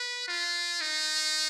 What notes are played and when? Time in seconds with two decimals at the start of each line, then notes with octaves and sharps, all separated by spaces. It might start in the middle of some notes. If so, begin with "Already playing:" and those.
Already playing: B4
0.28 F4
0.81 D#4